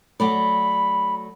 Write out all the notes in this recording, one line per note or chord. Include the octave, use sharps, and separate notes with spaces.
F#3 A3 D5 B5